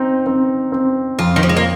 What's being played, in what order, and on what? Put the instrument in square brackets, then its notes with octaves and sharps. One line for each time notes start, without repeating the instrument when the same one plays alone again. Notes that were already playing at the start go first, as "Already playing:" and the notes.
Already playing: [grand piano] C4 [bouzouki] D#4
[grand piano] C4
C4
[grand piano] F2 [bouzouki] F4
[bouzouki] D#3
F3
G#3
A#3